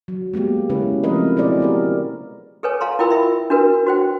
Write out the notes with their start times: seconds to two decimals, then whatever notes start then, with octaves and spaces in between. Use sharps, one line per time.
0.08 F#3
0.34 G#3 A#3 B3 G4
0.69 C#3 G#3 C#4 E4 G4 B4
1.03 F3 A3 C4 A#4 B4 D#5
1.36 B2 E4 F#4 G#4 C5 D5
1.60 B3 G4 A#4
2.63 G#4 A4 B4 C#5 G#5
2.81 A4 F5 A#5 C6
2.99 E4 F4 A#4 G5 B5 E6
3.10 E5 B5
3.50 D4 F#4 A#4 B4
3.87 F#4 C5 G5